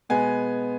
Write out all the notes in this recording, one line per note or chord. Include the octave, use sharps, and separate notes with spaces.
B2 G#3 B3 G#5